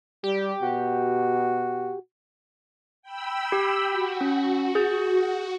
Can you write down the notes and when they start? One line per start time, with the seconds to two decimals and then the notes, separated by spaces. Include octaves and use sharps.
0.24 G3 G4
0.62 B2 F#4
3.02 G5 B5 E6
3.52 G4
3.85 F#4
4.21 C#4
4.75 G#4 G6